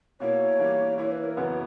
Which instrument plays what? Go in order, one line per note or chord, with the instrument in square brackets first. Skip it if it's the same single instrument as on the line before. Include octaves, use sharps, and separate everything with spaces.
[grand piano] B2 A#3 E4 [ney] C#5
[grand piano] E3 G3 A#3 D4
[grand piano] E3 A#3 E4 [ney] C#5
[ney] B4
A#4
[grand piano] F#2 C#3 E3 B3 F#4 [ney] B4